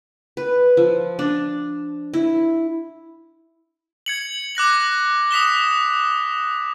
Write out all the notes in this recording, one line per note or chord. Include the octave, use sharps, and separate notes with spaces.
B4
F3
D4
E4
G#6 C#7 F#7
D6 F#6 A#6 F#7
D#6 B6 E7 G7